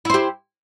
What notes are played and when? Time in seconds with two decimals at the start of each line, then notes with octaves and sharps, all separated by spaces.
0.05 E4
0.10 C5
0.14 G4